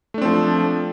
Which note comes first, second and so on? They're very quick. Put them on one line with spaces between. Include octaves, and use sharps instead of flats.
A3 D4 C4 F3